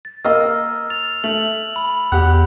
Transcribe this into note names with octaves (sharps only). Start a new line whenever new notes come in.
A6
A#3 D#5 E6 F6
A6 F7
A3 F#7
B5
E2 G4 F#5 F#6